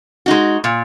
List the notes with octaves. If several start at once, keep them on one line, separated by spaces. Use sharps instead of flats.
G#3 D#4 F#4
A#2